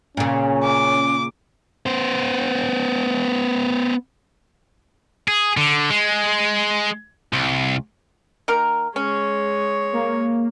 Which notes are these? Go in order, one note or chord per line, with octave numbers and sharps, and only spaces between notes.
A#2 C#3 C#4
D6
B3 C5
G#4
D3
G#3
C2
D#3 A#3 A#4
G#3 C#4 C#5
A#3